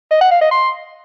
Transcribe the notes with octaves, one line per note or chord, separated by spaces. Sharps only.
D#5
F#5
F5
D#5
C6